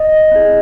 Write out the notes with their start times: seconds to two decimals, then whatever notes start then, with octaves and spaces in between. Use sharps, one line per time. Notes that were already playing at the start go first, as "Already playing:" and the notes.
Already playing: D#5
0.31 C4 E4 G#4